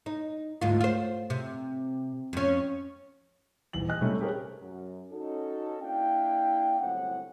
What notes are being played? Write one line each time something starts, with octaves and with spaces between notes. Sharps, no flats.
D#4
D2 G#2 F4
F4 C5
C3
F2 C#4
D#1 E2 F#7
D#5 G#5 F#6
C3 G3 A3 C#4
G4 G#4 A#4 C5 C#5
F#2
C#4 D#4 F#4 A4
A#3 D4 E4 F5 G5
G1 C2 A2 F#3 C4 F#5